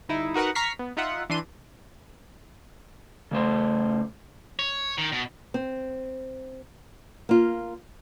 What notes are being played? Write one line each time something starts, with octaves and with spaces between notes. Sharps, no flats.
G1 D#4 E4
D#4 F#4 A#4 B4 F#5
A#5 C#6 F6 B6 C7
B3
D#4 F4 E5 F#5
E3 D4 C6 D#7
C#3 A3 C5
C#5
D#3
B2
C4
A#3 F4